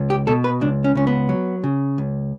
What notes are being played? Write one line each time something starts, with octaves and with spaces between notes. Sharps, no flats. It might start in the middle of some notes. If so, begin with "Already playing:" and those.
Already playing: C#2
G4
B2 A4
B4
C#2 D4
C#4
C#2 C#4
B3
F#3
C#3
C#2